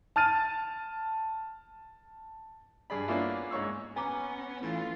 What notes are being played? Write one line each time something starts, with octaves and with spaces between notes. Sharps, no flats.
A5 F6 A6 D#7
G2 G#4 D5 B5
A#3 B3 C#4 D4 E4 F4
G#2 C#5 C#6 E6
B3 C#4 G#5 A#5 D6
A2 E3 F4